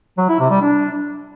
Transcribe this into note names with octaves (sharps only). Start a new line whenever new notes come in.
F#3
E4
C3
G3
D4